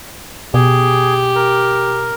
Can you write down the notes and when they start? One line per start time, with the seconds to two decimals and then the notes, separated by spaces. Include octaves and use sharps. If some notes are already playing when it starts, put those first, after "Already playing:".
0.54 B2 G4 G#4
1.35 A#4